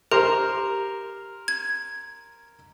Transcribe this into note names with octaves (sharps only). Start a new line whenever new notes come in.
G4 A#4 C5
G#6